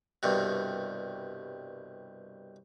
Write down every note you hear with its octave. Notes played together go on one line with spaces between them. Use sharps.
C2 G2 B2